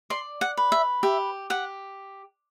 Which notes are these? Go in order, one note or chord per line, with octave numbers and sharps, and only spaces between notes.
D5 C6
F#5
B4
E5
G4 E5
G4 F#5